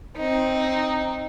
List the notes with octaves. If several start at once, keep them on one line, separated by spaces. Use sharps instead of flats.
C4 D#4